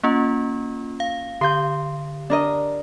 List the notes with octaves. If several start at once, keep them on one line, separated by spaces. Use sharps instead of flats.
A#3 C#4 F4
F5
D3 G4 C6 G6
D4 A#4 D#5